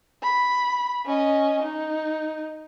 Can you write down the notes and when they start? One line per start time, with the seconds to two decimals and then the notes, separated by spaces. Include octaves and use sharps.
0.23 B5
1.06 C#4 D#5
1.63 D#4